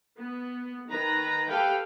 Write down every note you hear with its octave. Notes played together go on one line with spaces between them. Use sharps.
B3
D#3 B4 A#5
G4 A4 B4 F5 G5